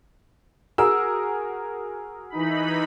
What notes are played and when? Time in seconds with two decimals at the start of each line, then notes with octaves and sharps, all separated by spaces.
0.78 F#4 G#4 A#4 E6
2.30 E3 D#4 B5